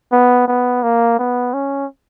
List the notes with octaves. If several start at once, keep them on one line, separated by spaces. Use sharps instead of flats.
B3
B3
A#3
B3
C#4